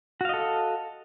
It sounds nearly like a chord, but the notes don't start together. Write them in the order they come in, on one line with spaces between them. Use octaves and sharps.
F#4 F5 D#5 A4